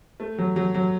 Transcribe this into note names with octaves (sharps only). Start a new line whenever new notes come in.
A3
F#3
F#3
F#3